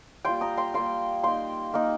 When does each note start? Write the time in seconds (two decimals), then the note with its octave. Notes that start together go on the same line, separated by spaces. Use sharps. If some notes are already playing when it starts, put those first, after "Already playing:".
0.25 G3 A#3 F4 G5 C6
0.41 A#5 D#6
0.57 G5 C6
0.74 G3 A#3 F4 G5 C6
1.23 A#3 D#4 G5 C6
1.74 A#3 D#4